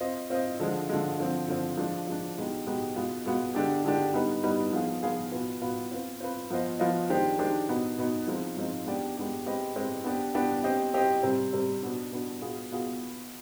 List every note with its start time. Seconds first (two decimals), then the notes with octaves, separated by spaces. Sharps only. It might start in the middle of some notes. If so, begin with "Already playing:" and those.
0.01 C4 F4 C5 D#5
0.30 C4 F4 C5 D#5
0.60 D3 F3 G#3
0.89 D3 F3 G#3
1.18 D3 F3 C4
1.48 D3 F3 C4
1.77 F3 G#3 D4
2.07 F3 G#3 D4
2.37 B2 G#3 B3 D#4 G4
2.66 B2 G#3 B3 D#4 G4
2.96 B2 G#3 B3 F4
3.26 B2 G#3 B3 F4
3.55 D3 G#3 D4 G4
3.85 D3 G#3 D4 G4
4.14 G3 B3 D#4 B4
4.44 G3 B3 D#4 B4
4.73 F3 B3 F4 G#4
5.03 F3 B3 F4 G#4
5.32 B2 B3 F4 B4
5.62 B2 B3 F4 B4
5.92 C4 F4 B4
6.20 C4 F4 B4
6.50 F3 B3 F4 C5 D#5
6.79 F3 B3 F4 C5 D#5
7.09 D#3 G#3 D4 G4 C5
7.39 D#3 G#3 D4 G4 C5
7.69 B2 B3 D#4
7.98 B2 B3 D#4
8.27 F3 G#3 C4 D#4
8.57 F3 G#3 C4 D#4
8.86 G#3 B3 D4 G4 D5
9.16 G#3 B3 D4 G4 D5
9.46 G#3 C4 G4 B4 D#5
9.76 G#3 C4 G4 B4 D#5
10.04 B3 D4 G4
10.35 B3 D4 G4
10.64 C4 G4 C5 D#5
10.94 C4 G4 C5 D#5
11.23 C3 G3 C4
11.53 C3 G3 C4
11.83 B2 B3 D4
12.12 B2 B3 D4
12.41 B2 B3 F4 G#4
12.71 B2 B3 F4 G#4